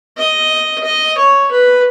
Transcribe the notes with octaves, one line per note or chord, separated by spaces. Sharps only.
D#5
D#5
C#5
B4